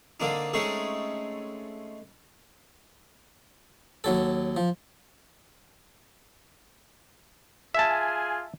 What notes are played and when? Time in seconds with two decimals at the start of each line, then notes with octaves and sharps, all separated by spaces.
0.20 D3 A#3 C4 D4 D#4
0.53 G#3 A3 C4 C#4 D#4 G#4
4.04 D#2 F#3 A4
4.57 F3
7.75 F4 G#4 E5 G#5 A5